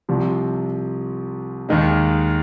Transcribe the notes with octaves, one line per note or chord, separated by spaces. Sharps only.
C2 C3 F3
D#2 D#3 G#3 D#4